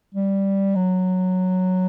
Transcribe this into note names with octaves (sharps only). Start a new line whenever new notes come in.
G3
F#3